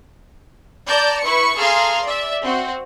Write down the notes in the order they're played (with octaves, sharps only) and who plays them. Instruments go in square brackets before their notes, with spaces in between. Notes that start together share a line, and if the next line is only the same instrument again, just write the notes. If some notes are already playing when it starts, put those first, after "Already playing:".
[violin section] D5 A5 A#5 G6
E4 B4 C#6 C#7
G#4 A4 F5 A#5 C6 F6
D5 E5
C4 F#4